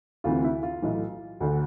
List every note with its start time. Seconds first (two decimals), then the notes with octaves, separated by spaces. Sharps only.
0.24 D2 C3 E3 F4
0.44 E4
0.63 F4
0.82 B1 A2 E3
1.40 D2 D3